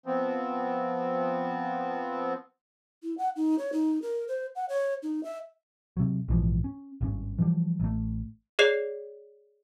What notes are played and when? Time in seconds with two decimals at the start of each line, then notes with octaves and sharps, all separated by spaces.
0.06 F3 B3 C4
3.03 E4
3.18 F#5
3.36 D#4
3.59 C#5
3.73 D#4
4.02 A#4
4.28 C5
4.56 F#5
4.69 C#5
5.03 D#4
5.24 E5
5.97 C3 F#3
6.28 A#1 G#2 E3 F3
6.64 C#4
7.01 G#1 G2 C#4
7.38 E3 F3 G3
7.80 A1 A3
8.59 G#4 C#5 D5 C7 F7